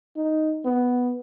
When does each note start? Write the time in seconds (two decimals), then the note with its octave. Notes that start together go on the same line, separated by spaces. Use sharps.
0.17 D#4
0.65 B3